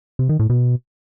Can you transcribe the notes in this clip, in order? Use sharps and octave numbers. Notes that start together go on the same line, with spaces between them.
C3
D#3
A2
B2